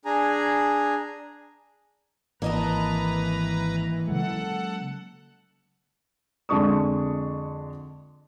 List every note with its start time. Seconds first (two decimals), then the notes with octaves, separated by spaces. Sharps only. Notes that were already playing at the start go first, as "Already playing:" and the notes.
0.05 D4 G#4 G#5 A#5
2.42 G#1 E3 A#3 B4 D#5 A5 A#5
4.08 C#3 F#3 G#3 A4 F#5
6.49 F2 D3 G#3 D4 C#6 D#6